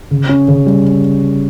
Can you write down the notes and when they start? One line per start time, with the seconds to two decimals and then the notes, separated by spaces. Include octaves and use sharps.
0.11 C#3
0.29 C#4
0.48 C#3
0.66 G3